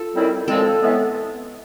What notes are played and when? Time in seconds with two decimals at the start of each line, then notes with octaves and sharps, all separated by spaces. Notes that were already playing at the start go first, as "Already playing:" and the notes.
Already playing: F4 A4
0.15 F#2 D#3 G3 C4 E4
0.48 F#2 D3 F3 G#3 C4 A4
0.81 A2 E3 G#3 B3